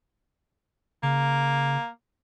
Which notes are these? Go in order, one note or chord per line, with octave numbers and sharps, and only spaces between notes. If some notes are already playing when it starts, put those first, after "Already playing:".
C#3 A#3